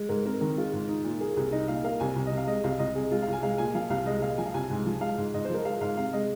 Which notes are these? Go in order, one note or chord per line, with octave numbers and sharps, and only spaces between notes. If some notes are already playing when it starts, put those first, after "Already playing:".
Already playing: G#3
G#2 A#4
C4 A#4
D#3 A#4
G#3 F4
G#2
D#4
A#2
A#3 G#4
C2 G#4
D#4 D#5
A#2 F5
A#3 F5
C2 G#5
C2
D#5
C3
F5
G#3 D#5
C2 F5
C2 D#5
C3 G#4
G#3 F4
F5
C2
G#5
G#3 F5
A#2 G#5
F3 F5
C2 F5
G#3 D#5
A#2 F5
F3 G#5
F5
C2 G#5
G#2
F3
G#3 F5
G#2
G#2 D#5
C5
F3 A#4
G#3 F5
G#2 F5
C3 F5
G#3 D#5